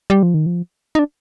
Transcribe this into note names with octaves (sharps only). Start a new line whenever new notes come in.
G3
F3
D#3
F3
D#4
D4